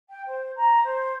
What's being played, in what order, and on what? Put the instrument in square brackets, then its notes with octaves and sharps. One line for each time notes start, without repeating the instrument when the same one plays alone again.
[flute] G5
C5
A#5
C5